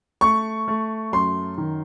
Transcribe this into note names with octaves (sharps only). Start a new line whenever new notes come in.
A3 C#6
A3
F#2 C6
D#3